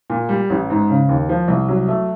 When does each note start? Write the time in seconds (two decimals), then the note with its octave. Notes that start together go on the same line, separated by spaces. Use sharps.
0.10 A#2
0.29 G3
0.50 A1
0.70 G#2
0.90 C#3
1.09 D#2
1.29 F3
1.48 C2
1.69 F#3
1.88 A3